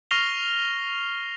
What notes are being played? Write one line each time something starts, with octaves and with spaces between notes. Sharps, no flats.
C#6 F6 A#6 C7 F7 G7